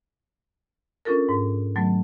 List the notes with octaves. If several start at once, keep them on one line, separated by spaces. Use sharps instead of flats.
C#4 D4 F4 A4 A#4
G#2
D#3 F#3 A3 B3